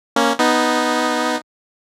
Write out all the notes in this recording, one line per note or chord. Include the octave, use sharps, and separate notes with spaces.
A#3 C#4
B3 D#4